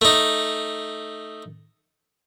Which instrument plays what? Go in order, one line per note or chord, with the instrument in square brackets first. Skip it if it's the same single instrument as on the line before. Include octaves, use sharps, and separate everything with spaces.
[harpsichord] A3 D#4